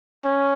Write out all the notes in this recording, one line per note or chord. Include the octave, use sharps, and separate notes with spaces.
C#4